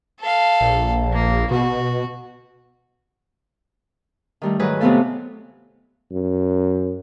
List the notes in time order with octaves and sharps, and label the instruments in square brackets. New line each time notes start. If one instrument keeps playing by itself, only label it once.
[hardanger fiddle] A4 F5
[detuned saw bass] A#1
[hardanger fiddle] A#3
[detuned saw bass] B2 [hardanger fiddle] F#4
[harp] D#3 G3 A3
G#2 D#3 F#3 G#4 B4
C3 F#3 A3 B3 F4 A4
[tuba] F#2